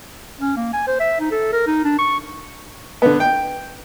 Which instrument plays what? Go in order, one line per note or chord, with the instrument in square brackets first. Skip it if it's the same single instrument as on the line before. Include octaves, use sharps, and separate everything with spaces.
[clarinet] C#4
A#3
G#5
C5
E5
D#4
A4
A#4
D#4
D4
C#6
[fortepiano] D3 B3
G5